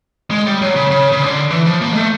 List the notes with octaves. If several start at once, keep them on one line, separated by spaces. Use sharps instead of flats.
G#3
G3
F#3
C#3
C#3
C#3
D3
E3
F3
A#3
G#3
A3